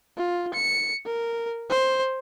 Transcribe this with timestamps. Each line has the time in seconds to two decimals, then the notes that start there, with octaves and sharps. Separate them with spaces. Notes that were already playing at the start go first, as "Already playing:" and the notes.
0.18 F4
0.54 C#7
1.06 A#4
1.70 C5